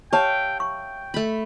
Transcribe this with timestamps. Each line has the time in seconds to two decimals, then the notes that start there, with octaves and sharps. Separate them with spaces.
0.13 G4 C#5 E5 F5 G5 A5
0.60 G5 C#6
1.14 A3 B5